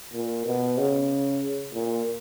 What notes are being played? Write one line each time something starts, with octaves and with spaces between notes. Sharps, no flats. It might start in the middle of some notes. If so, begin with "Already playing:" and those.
A#2
B2
C#3
A#2